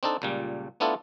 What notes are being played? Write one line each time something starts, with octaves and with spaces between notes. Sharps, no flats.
C4 D4 D#4 A4
C#2 A#2 G3
A3 B3 D4 E4 F4 A4